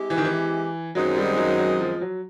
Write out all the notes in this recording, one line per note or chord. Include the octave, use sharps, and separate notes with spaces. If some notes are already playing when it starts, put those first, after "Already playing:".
Already playing: G#3 C4 E4 G4
E3
D#3
E3
F#2 D#3 F#3 G#3 C4 D#4
G3
F#3
F#3
F3
F#3